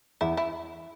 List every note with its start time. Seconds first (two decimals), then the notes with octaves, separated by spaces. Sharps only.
0.21 E2 E4
0.37 E4